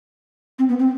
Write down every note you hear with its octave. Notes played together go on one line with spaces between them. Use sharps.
C4
B3
C4